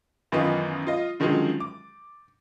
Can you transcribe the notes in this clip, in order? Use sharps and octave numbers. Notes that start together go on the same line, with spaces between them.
F#2 D#3 E3 B3 D#4 F4
F4 D#5
D3 D#3 F3 F#3 G#3 C#4
D6